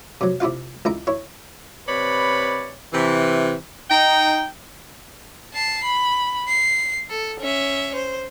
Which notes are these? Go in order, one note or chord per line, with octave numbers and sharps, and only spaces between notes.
C3 F#3
C3 E4 F4 F5
C#2 E4 A#5
E4 C#5
C3 B4 C#5 D5 B5
C3 E3
D#4 G5
A5 C7
B5
C7
A4
C#4 E5
C5